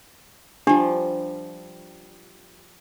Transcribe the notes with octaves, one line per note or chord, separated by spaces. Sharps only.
F3 G3 D4 G4